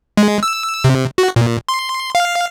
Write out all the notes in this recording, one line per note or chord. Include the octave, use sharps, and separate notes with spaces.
G#3
E6
C3
F#4
A#2
C6
F5